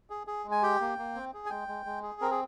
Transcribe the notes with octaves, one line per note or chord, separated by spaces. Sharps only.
G#4
G#4
G#3
G#5
G4 G5
A#3
A#3
C4
G#4
G#5
G#3 G5
G#3
G#3
G#4
C4 A#4
G#4